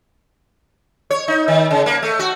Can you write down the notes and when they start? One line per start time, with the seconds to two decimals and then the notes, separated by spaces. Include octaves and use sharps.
1.11 C#5
1.28 D#4
1.48 D#3
1.71 C#3
1.86 A#3
2.02 A3
2.19 F#4